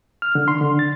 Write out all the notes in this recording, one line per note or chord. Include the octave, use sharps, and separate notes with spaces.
F6
D3
C6
D3
A6